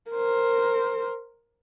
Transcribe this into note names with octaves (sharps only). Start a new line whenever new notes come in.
A#4 C5